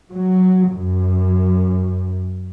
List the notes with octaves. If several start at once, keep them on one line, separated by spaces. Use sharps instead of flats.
F#3
F#2